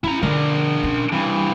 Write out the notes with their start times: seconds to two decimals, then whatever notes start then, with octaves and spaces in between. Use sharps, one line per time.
0.04 C#4 E4 A#5
0.23 D3 D4 A#4
0.84 C#4
1.12 G2 E3